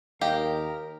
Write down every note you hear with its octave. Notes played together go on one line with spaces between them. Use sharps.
D#2 G4 A#4 D#5 F5 G5